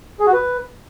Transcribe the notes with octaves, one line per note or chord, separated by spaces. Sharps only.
G#4
F#4
B4